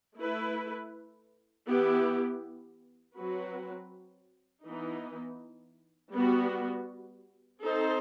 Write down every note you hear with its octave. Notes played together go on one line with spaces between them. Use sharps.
A3 E4 B4
E3 B3 E4 G4
F#3 C4 F#4 B4
E3 B3 D#4
G3 B3 F#4
C4 D#4 A4 C5